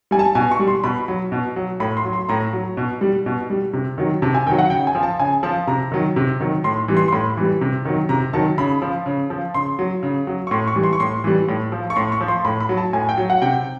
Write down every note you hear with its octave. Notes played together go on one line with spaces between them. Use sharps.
G3 G#5
A5
B2 G#5
C#6
G3
C6
B2 B5
F#3
B2
F#3
A2 B5
C6
F#3
C6
A2 A#5
F#3
B2
G3
B2
G3
C3
D#3 F#3
C3 A5
G#5
D#3 F#3 G5
F#5
C#3 G5
G#5
F3
A5
C#3 G#5
F3 A5
C3 A#5
D#3 F#3
C3
D#3 F#3
A2 C6
E3 G3
C6
C6
A2 B5
E3 G3
C3
D#3 F#3
C3 A#5
D#3 F#3 A5
C#3 B5
F3
C#3
F3
C#3 C6
F#3
C#3
F#3
C#6
A2 C6
C#6
E3 G3
C6
C#6
A2 C6
E3 G3
A2
F3
C#6
A2 C6
C#6
F3
C6
A2 B5
B5
F#3
A5
A2 G#5
G5
F#3
F#5
C3 G5